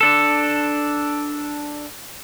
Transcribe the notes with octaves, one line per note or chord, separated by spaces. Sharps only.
D4 A4